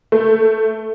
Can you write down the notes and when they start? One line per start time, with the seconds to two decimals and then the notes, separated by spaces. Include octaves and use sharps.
0.12 A3